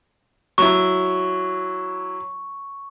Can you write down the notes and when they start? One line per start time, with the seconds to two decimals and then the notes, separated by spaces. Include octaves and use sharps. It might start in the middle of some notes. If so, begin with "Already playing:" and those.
0.58 F#3 E4 C#6